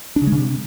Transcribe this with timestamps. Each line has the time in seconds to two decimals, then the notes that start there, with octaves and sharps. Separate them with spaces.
0.16 D4
0.22 C#3
0.27 G#3
0.32 C#3
0.37 C3